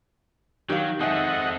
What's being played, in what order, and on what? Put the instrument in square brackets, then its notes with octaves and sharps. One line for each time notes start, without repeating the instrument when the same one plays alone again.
[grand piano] D#3 [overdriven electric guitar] F#3 [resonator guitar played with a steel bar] G4 F5
[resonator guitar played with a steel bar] G#3 E5 [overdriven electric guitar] C4 A4 [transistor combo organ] D#5 F#5